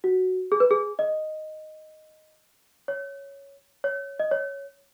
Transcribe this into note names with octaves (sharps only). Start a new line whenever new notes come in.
F#4
G#4
B4
G#4
D#5
C#5
C#5
D#5
C#5